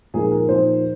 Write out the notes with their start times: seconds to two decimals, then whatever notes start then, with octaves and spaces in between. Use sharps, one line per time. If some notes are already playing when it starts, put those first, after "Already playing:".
0.14 A#2 F3 A#3 D#4 G#4
0.32 A#4
0.48 A#2 F3 A#3 D#4 C5